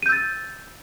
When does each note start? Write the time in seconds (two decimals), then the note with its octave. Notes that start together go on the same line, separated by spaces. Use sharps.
0.03 D#7
0.06 G6
0.09 E6
0.12 A6